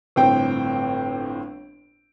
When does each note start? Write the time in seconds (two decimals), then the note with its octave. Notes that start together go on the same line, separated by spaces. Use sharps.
0.16 G1 A2 C4 G5